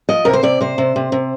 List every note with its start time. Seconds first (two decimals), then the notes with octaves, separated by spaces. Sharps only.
0.09 F3 D#5
0.25 C3 A#4
0.33 C5
0.43 C3 D5
0.60 C3 C5
0.78 C3
0.96 C3
1.12 C3